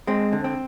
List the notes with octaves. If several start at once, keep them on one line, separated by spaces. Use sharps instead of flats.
G#3 C4
D3
C4